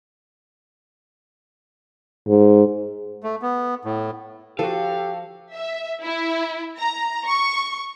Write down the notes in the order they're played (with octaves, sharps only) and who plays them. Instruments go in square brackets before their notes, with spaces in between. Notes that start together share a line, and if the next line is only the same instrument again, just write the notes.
[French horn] G#2
[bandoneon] A3
B3
A2
[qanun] F3 [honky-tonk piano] F#4 A4 [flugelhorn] G4 [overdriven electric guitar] F5
[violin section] E5
E4
A#5
C#6